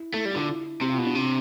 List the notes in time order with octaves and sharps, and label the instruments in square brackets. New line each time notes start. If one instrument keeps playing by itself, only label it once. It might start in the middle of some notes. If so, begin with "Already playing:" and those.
Already playing: [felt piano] E4
[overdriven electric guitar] A3 [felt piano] E4
[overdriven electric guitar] G3
[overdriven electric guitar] D3 [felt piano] F4
[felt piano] E4
[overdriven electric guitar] C3 [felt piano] G4
[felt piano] F4
[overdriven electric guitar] B2 [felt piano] E4
[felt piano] D4
[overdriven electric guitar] C3